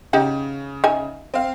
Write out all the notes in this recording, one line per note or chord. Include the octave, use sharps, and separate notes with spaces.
C#3 D#4 G4 F#5
D#4 E5 G#5
C4 F5